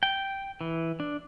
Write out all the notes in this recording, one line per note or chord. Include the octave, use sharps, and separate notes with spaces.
G5
E3
D4